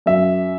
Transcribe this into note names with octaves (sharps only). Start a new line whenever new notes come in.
F#2 E5